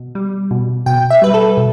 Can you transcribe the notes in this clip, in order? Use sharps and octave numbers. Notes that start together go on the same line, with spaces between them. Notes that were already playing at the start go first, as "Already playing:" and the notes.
Already playing: B2
G3
B2
B2 G5
E5
G3 B4
A4
B2